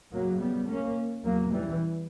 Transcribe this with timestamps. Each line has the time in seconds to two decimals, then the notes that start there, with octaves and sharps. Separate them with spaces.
0.12 F#2 C#3 F#3 A#3
0.40 G3 B3
0.68 A#3 C#4
1.24 E2 C#3 F#3 A#3
1.52 E3 G3